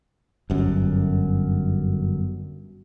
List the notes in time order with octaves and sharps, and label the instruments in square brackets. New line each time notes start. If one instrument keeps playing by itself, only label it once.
[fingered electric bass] G1 F#2